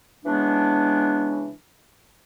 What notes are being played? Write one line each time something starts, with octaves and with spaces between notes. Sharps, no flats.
C#3 E3 G#3 B3 D4